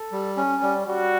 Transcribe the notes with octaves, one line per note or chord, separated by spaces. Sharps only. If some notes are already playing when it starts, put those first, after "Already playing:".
Already playing: A4
G3
C#4
G3
G3 F#4